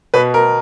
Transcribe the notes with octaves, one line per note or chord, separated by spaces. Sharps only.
B2 B4
A#4